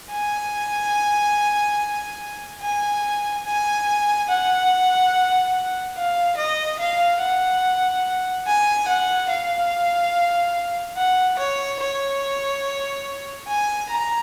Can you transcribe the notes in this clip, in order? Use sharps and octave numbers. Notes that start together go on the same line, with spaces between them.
G#5
G#5
G#5
F#5
F5
D#5
F5
F#5
G#5
F#5
F5
F#5
C#5
C#5
G#5
A#5